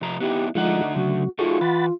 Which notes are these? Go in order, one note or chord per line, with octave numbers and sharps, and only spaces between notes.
C3 F3 A#5
B3 D#4 E4 G4
D3 F3 G#3 A3 D#4 F4 F#5
C#3 F#3 F#4
A3 D#4 F4 F#4 G#4 A4 C#6
E3 F#5 B5 A6